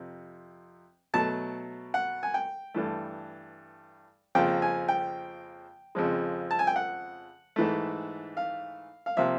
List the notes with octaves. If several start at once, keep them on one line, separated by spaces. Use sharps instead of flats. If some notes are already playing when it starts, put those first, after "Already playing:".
Already playing: F2 C3
B2 F#3 A3 A5
F#5
G#5
G5
G2 E3 A3
F2 C#3 F3 A#3 G5
G#5
G5
F2 C#3 F3 G#3
A5
G#5
G5
F#5
G#2 E3 A3
F5
F5
C3 F3 A#3 E5